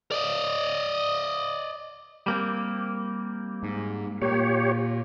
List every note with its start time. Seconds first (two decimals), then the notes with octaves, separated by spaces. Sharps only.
0.12 D5 D#5
2.26 G3 A#3 C4
3.63 G#2
4.22 A#2 G4 C#5